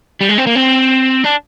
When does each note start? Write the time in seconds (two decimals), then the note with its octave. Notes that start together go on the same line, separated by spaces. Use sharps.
0.21 G3
0.29 G#3
0.38 C4
0.47 A#3
0.55 C4
1.24 D4